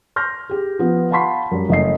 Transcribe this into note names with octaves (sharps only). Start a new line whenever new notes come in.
C6 F6 G6 A#6
G4 G#4
F3 B3
F5 F#5 A5 B5 C6 B6
F#2 G3
F#1 A3 D#5 C7